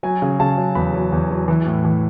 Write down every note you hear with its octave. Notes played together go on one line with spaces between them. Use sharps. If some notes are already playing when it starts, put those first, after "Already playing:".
F#3 G#5
C#3
C#3 A5
F#3
E2 B5
F#3
E2
F#3
E3
A2
E3